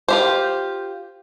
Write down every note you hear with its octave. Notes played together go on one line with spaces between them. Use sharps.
F4 G4 C5